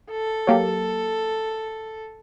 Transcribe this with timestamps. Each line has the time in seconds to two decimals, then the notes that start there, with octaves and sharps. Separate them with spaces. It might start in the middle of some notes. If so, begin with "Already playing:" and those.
0.11 A4
0.47 F#3 A#3 G4